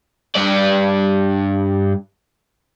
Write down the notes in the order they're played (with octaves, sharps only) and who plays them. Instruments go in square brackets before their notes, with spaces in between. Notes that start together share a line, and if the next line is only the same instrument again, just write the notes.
[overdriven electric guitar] G2 D5